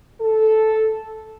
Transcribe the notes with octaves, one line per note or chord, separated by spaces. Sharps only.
A4